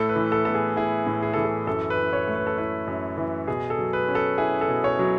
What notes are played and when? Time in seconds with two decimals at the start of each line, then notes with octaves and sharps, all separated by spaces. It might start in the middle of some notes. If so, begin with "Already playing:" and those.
Already playing: A2 A4
0.09 B4
0.16 E3
0.32 A4
0.45 B3 A4
0.54 G#4
0.77 E4 G#4
1.07 A2
1.22 G#4
1.33 E3 A4
1.44 G#4
1.67 F#2 A4
1.90 B4
1.97 E3
2.13 C#5
2.28 A3
2.35 B4
2.47 A4
2.58 E4 B4
2.87 F#2
3.18 E3
3.48 B2 G#4
3.70 A4
3.79 F#3
3.93 B4
4.08 C#4
4.15 A4
4.38 E4 G#4
4.61 A4
4.68 B2
4.84 C#5
4.99 F#3